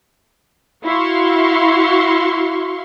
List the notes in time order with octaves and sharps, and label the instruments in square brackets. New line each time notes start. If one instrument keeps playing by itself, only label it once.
[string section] E4 F#4 F5 C6 C#6